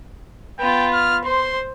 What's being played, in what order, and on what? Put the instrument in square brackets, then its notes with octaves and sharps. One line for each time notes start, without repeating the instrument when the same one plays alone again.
[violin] B3 F4 [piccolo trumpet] G5
[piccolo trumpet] F6
[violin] C5 [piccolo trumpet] C6